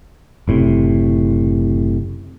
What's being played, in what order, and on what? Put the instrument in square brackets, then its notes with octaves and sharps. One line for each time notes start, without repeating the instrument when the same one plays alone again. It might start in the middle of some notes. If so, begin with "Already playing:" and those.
[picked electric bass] F#1 A2 C3